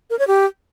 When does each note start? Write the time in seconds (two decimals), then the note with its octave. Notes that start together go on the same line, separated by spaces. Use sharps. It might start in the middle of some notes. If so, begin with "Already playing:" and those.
0.10 A#4
0.19 C#5
0.28 G4